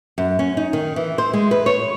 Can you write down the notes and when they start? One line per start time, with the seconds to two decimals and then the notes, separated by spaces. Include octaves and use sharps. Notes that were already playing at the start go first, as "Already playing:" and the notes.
0.18 F#2
0.39 C#4
0.57 D#4
0.73 D#3
0.96 E3
1.18 C5
1.33 G#3
1.51 B4
1.66 C#5